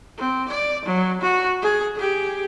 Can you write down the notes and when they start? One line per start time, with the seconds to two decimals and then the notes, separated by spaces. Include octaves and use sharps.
0.17 C4
0.49 D5
0.85 F#3
1.21 F#4
1.62 G#4
1.96 G4 G#4